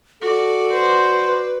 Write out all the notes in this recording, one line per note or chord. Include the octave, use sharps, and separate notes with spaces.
F#4 A4 D5
B4 C5